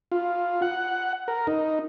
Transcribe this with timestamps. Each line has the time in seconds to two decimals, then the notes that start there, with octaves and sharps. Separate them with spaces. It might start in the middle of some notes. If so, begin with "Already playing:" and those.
0.12 F4
0.62 F#5
1.28 A#4
1.47 D#4